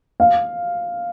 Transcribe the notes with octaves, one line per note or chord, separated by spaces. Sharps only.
F5